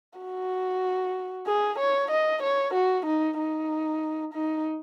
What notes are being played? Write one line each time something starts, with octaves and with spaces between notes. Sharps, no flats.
F#4
G#4
C#5
D#5
C#5
F#4
D#4
D#4
D#4